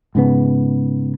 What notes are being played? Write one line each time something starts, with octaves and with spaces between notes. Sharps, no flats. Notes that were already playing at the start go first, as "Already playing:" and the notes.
G#2 C#3 B3